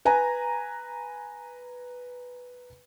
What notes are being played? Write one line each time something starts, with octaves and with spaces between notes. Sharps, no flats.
B4 G#5 A#5